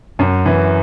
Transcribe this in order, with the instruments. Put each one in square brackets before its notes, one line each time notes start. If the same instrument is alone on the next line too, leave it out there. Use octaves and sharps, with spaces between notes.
[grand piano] F#2
E3